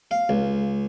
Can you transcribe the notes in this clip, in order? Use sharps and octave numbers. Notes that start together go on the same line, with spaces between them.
F5
C#2